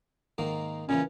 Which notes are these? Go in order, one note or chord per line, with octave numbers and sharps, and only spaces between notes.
G#2 D#3 A#3
A#2 C#3 E3 C#4